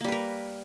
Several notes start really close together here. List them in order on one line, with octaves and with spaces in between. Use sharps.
A#3 G3 B4 A#4